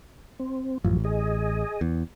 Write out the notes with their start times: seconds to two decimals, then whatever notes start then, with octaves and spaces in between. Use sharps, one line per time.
0.40 C4
0.84 A1 F#2 F3
1.05 G#4 D#5
1.81 E2